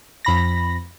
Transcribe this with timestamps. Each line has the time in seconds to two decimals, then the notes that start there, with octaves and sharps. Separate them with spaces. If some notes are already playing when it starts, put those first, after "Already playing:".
0.25 F2 B5 A#6